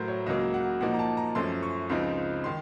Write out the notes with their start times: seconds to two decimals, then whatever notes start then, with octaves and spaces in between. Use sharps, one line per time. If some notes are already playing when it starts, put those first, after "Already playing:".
Already playing: A2 F#3 A3 A#4 C5
0.08 C#5
0.26 C#2 C#3 F#3 A#3 D#5
0.54 F#5
0.81 A#2 F3 A#3 D#4 F#5
0.94 A#5
0.99 A5
1.17 A#5
1.35 F#2 F3 A3 C#4 C6
1.63 C#6
1.89 C#2 C#3 F3 C4 D#4 C6
2.44 D#3 C6